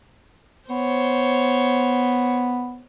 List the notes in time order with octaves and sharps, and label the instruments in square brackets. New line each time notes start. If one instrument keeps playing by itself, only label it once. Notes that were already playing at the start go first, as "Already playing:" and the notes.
[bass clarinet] B3 [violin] C5 C#5